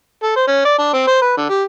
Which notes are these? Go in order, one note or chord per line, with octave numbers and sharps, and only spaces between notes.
A4
C5
C#4
D5
D4
C4
C5
B4
D3
G4